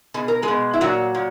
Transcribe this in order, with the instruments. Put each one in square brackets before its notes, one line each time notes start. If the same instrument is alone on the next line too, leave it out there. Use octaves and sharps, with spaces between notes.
[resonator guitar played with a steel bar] B2 G#4
A#4
G#3 G#4
B2
E4
A#2 F#3 F#4
A#2